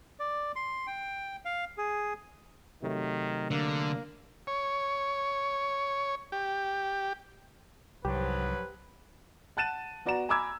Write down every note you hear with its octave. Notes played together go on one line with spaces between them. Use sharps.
D5
C6
G5
F5
G#4
C3 D#3 F#3 A3
D3 A#3
C#5
G4
C2 G#2 F3 F#3 G4 B4
F#5 A5 F#6 A6 D#7 E7
B3 F#4 D5 F#5 A#5 E7
G#5 A#5 B5 D6 E6 G#6